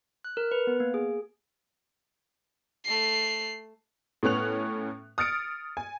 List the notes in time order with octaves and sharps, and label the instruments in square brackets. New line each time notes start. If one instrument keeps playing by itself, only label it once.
[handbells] F#6
A#4
B4
B3
A#3
G#4
[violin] A3 C7
[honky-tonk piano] A2 B3 C#4 F#6 F7
D#6 F6 A6 C#7 D7
G#5